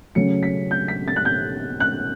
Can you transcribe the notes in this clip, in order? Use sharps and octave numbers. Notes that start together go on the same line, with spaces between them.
C#3 F#3 A3 C#4 C#7
B6
G6
B6
A6
F#6
G6
F#6